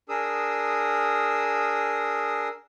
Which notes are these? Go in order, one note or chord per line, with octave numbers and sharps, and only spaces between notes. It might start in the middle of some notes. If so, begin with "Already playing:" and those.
D4 G#4 A#4 D#6 E6